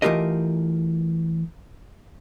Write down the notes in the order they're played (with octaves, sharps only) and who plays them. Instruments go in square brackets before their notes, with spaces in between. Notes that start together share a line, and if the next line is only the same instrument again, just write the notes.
[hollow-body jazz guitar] E3 A3 F4 G4 A#4 D#5